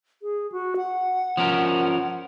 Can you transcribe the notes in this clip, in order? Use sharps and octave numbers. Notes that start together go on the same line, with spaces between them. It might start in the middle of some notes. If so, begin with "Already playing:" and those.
G#4
F#4
F#5
F3 C#4 A#4